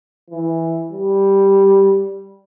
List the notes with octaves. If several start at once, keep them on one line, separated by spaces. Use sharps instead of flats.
E3
G3